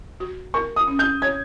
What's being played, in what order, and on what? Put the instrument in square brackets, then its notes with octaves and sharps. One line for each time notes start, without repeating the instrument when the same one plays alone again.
[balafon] F#4
[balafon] A#4 [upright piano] C#6
[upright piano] D#6
[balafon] C#4
[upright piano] G6
[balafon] C#5 [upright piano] G#6